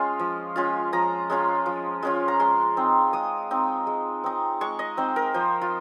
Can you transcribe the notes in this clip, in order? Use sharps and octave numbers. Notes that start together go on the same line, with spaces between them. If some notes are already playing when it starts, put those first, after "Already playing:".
Already playing: G#3 C#4 F4 D#5 F5
F3
G#3 C#4 F4
F3 A#5
G#3 C#4 F4
F3
G#3 C#4 F4
A#5
G#3 C6
C4 D#4
G#3 D#6
C4 D#4
G#3
C4 D#4
G#3 C#6
D#5
C4 D#4 C5
A#4
F3 C5
F4